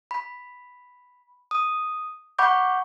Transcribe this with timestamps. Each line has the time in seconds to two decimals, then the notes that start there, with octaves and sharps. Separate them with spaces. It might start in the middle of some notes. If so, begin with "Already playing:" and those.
0.11 B5
1.51 D#6
2.39 F#5 B5 C#6 D6 G6